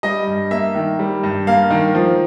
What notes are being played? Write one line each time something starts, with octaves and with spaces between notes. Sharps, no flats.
G3 D#5
G2
A#3 E5
D#3
G3
G2
A#3 F5
D#3
F3